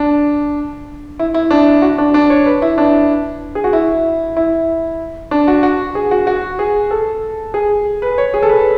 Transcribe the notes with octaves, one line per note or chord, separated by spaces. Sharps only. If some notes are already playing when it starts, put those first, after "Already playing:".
Already playing: D4
E4
E4
D4
F#4
D4
D4
C#5
B4
E4
D4
G#4
F#4
E4
E4
D4
F#4
F#4
G#4
F#4
F#4
G#4
A4
G#4
B4
C#5
G#4
A4
B4